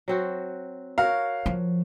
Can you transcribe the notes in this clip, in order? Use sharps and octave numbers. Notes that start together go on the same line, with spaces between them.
F#3 C4 F#4
F#4 A#4 C#5 F5
F3